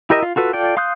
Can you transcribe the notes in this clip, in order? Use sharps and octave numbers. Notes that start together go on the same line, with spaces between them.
E4 G4 A#4 D#5 E5
F4
F4 F#4 A4 B4
F4 A4 D5 G5
F5 C6 D#6 F#6 G6